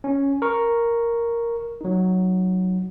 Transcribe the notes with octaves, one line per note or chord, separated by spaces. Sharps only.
C#4
A#4 C#6
F#3 D#4